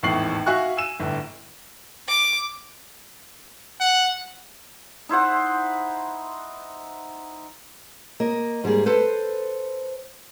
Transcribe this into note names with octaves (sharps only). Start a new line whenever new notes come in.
G#1 E2 A2 C#6 C7 F#7
F#4 E5 F5 G#5 C#6 F#6
G#5 E6 D#7 E7
G1 A2
D6
F#5
D#4 E4 C5 F#5
A#3 D#5
G#2 G3 A#3 G#4
A4 B4 C5